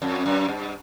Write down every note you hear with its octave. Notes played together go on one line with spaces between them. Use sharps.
F2
F#2
G2